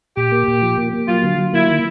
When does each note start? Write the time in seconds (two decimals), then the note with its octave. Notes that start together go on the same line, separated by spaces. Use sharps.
0.17 A#2 G4
0.32 A#3
0.48 A#2
0.62 F3
0.78 A#3
0.93 A#3
1.08 F#3 F4
1.23 D3
1.39 F#3
1.53 A#3 E4
1.68 D#3